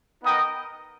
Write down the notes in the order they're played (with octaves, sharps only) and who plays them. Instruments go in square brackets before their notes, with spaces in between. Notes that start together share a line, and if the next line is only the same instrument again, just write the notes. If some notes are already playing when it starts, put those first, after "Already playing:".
[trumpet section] B3 D#4 A#4 D#5 G5